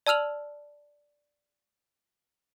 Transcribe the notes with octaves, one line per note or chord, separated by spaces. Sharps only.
D5 A5 E6 F6 F7 F#7